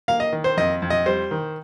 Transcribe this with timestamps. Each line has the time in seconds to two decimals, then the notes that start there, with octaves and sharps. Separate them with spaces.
0.08 A#3 F5
0.20 D#5
0.33 D#3
0.44 C5
0.57 F2 D#5
0.82 F2
0.90 D#5
1.06 G3 C5
1.31 D#3